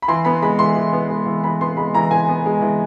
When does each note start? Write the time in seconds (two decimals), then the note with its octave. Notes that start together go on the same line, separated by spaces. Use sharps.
0.02 B5
0.08 E3 C6
0.25 B3 B5
0.42 G#3 B5
0.59 E3 C6
0.75 E3
0.93 B3
1.10 G#3
1.26 E3
1.44 E3 B5
1.61 B3 C6
1.77 G#3 B5
1.94 E3 A#5
2.11 E3 G#5
2.29 B3
2.46 G#3
2.62 E3